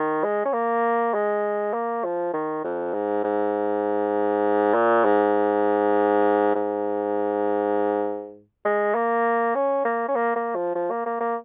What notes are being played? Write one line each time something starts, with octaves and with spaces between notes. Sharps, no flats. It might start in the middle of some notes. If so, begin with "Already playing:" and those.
Already playing: D#3
G#3
C#4
A#3
G#3
A#3
F3
D#3
F2
G#2
G#2
A#2
G#2
G#2
G#3
A#3
C#4
A#3
C#4
A#3
A#3
F3
F3
A#3
A#3
A#3